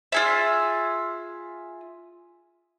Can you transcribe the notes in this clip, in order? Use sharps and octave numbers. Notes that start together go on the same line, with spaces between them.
F4 G#4 E5